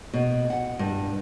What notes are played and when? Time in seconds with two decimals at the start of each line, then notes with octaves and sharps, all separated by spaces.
0.13 B2
0.50 F#5
0.79 G2